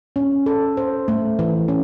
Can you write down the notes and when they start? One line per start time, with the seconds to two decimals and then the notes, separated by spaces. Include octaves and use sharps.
0.16 C#4
0.46 A4
0.77 C5
1.08 A3
1.39 E3
1.68 C#4